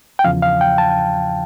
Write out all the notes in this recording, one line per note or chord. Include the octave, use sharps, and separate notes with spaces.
G5
E2 C#3 F3 F5
F5
G5
A5